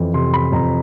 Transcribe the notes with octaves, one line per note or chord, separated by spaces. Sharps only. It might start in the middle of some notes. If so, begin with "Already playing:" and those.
Already playing: F2 E3
C3 C6
B5
F2 A#5